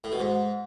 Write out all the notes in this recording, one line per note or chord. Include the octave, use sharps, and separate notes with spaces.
A2
B2
G#2